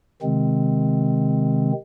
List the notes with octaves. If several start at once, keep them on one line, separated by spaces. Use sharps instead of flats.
C3 D#3 G#3 C4